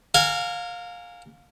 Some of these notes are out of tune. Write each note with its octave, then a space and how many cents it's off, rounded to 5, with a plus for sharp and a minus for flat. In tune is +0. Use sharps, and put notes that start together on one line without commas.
A#4 -30 F5 +20 G#5 -10